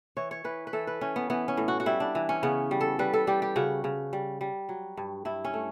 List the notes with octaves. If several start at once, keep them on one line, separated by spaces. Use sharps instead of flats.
E3 C#5
C#5
E3 B4
B4
E3 A4
B4
E3 C#4
B3
E3 B3
C#4
A2
F#4
F#4
G3 E4
D4
E3
C#4
C#3 B3
G3
A4
G3 B4
A4
G3 G4
G4
C#3 F#4
C#3
G3
G3
F#3
G2
G2 E4
C#4
A3